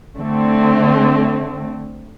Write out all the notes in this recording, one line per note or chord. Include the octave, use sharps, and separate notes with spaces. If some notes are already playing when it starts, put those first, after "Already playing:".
D3 A3 C4